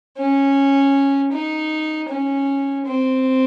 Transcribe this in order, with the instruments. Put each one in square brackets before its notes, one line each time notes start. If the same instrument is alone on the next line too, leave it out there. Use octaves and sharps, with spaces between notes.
[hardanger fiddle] C#4
D#4
C#4
C4